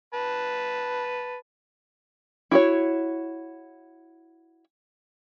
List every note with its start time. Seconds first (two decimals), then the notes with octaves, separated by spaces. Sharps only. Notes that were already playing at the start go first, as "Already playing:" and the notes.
0.14 B4 A5
2.51 E4 F#4 C#5